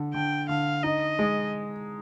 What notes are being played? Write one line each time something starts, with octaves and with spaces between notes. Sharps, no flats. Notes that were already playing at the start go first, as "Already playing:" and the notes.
Already playing: D3
D3 G5
D3 F5
D#4 D#5
G#3